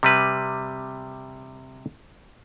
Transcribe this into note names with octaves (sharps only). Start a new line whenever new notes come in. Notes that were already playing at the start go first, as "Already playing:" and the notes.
C3 G3 B4